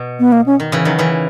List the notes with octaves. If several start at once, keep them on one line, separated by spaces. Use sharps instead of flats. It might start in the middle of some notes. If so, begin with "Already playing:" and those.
Already playing: B2
B3
A#3
C#4
D#3
C#3 E3
D#3 F#3
C#3 E3